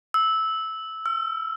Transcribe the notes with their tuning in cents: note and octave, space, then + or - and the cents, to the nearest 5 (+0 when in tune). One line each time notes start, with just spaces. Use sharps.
E6 -15
E6 +40